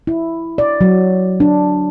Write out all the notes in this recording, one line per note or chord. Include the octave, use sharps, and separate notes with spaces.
E4
D5
F#3
D4